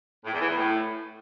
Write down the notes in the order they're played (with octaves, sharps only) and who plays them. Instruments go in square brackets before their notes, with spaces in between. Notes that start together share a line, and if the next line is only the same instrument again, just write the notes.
[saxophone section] A2
E2
E3
E2
A2